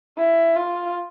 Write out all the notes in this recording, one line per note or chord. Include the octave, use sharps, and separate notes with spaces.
E4
F4